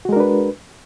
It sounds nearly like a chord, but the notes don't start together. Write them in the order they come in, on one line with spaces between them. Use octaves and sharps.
F#4 G#3 A#4 D4 B4